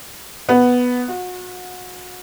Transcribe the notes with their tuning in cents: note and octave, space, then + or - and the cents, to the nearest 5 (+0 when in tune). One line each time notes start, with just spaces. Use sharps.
B3 +0
F#4 -35